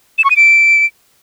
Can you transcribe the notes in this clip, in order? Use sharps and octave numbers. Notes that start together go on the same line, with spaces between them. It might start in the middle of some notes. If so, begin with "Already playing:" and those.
E7
C#6
D#7
D7